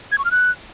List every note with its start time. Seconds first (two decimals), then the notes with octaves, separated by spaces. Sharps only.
0.12 G#6
0.18 C#6
0.25 F6
0.31 F#6